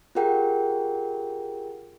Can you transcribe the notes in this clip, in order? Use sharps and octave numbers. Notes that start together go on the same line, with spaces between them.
F4 G4 G#4 A#4 F#5 G5